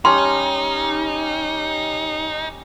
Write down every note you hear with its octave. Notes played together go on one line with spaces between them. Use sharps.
G3 C#4 D#4 A#5 C6